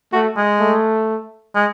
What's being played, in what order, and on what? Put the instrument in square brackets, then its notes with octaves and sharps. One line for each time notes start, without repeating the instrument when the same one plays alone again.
[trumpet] A3 [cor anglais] F#4
[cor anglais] G#3
[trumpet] A3
[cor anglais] G#3